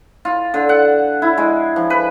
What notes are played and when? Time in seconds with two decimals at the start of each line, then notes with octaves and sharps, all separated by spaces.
0.25 F4
0.54 D3
0.69 F#5
1.22 E4
1.38 G#3
1.76 F3
1.90 B4